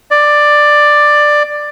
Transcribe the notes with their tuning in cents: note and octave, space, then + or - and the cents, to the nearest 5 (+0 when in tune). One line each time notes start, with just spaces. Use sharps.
D5 +10